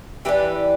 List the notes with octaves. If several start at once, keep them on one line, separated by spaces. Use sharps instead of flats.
E3 B3 D4 G4 B4